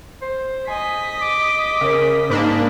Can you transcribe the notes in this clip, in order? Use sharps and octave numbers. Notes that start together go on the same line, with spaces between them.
C5
D#5 G#5 B6
D6
C#3 A#4
G#2 A#3 D4 B5